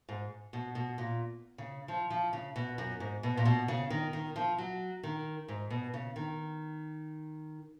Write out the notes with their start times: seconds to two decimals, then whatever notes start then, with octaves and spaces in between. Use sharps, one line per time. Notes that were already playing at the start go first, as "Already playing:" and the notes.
0.09 G#2
0.53 B2
0.75 B2
0.98 A#2
1.58 C#3
1.88 F3
2.10 F3
2.33 C#3
2.56 B2
2.78 F#2
3.00 G#2
3.23 B2
3.37 A#2
3.45 B2
3.68 C#3
3.90 D#3
4.13 D#3
4.36 F3
4.58 F#3
5.03 D#3
5.48 G#2
5.70 B2
5.94 C#3
6.16 D#3